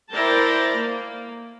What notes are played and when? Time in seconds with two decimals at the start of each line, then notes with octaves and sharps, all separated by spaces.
0.13 E4 A#4 C5 D5 G5 A5
0.78 A#3